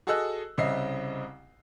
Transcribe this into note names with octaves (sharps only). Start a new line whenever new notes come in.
F#4 G#4 A4 D#5 E6 F#6
C2 C#3 C4 D#5 E5 C7